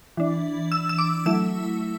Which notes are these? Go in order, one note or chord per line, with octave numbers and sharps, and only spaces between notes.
E3 D4
E6
E6
D6
F#3 A3 E4 E6